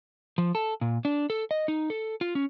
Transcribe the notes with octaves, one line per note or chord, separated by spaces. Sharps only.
F3
A4
A#2
D4
A4
D#5
D#4
A4
F4
C#4